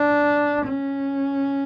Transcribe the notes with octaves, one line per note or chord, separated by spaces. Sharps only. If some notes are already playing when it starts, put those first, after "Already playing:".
Already playing: D4
C#4